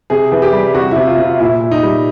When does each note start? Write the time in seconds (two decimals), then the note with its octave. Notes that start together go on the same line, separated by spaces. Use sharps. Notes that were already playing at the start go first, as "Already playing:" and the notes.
0.10 C3 G#4
0.32 E3
0.42 G4
0.53 G3
0.74 C3 F#4
0.91 C3 E4
1.07 F4
1.18 C3 F4
1.40 A#2 E4
1.61 A#2
1.71 D#4
1.83 G3